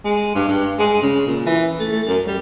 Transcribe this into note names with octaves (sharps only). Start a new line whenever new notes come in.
G#3
G2
G2
G#3
C#3
A#2
E3
A3
A3
F#2
G3